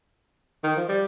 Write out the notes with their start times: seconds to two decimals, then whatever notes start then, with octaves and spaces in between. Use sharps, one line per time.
0.64 D#3
0.77 F3
0.89 G3